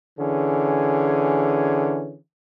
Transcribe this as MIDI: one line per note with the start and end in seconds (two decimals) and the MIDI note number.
0.18 2.17 50
0.18 2.17 52
0.18 2.17 61
0.18 2.17 68